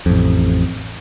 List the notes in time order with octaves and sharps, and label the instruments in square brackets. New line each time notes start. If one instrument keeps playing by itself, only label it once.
[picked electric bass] A1 F2